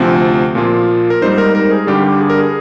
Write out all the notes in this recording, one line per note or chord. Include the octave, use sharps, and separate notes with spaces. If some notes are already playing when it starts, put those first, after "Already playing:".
Already playing: D2 C3 F3 C4
A#2 F3 A#3 F4
A#4
G#2 G3 C4 D#4 C5
A#4
A#4
G#4
G2 D3 G3 G4
G#4
A#4
G#4